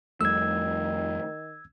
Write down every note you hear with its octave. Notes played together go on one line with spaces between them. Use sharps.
F2 D#3 G3 A3 E6 G#6